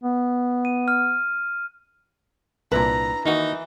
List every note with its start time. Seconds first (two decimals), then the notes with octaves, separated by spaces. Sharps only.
0.04 B3
0.65 D#7
0.88 F6
2.72 C2 A#2 D4 E4 B4 A#5
3.26 D#3 E3 A#3 D#4 F#4